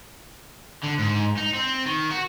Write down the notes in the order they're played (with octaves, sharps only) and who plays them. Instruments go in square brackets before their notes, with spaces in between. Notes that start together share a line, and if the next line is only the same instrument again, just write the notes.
[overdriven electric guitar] D3
G#2
D#4
C4
D#3
F#4